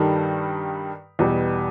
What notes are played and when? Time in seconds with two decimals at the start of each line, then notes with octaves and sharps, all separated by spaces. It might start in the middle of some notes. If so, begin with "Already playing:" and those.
Already playing: G2 D#3 G3 D#4 A4
1.19 E2 B2 G3